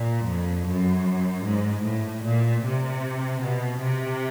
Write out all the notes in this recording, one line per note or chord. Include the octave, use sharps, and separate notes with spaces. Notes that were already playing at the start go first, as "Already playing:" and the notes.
Already playing: A#2
F2
F#2
G#2
A2
A#2
C3
B2
C3